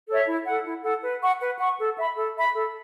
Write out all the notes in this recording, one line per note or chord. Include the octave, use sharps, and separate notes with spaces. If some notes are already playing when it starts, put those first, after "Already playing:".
A4 C#5 E5
E4
A4 F#5
E4
A4 F#5
B4
F#5 C#6
B4
F#5 C#6
A4
E5 B5
A4
E5 B5
A4